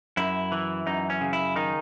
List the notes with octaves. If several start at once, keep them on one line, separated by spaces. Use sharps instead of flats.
F#2 E4
E3
F#2 D#4
C#4
C#3
E4
D#3 D#4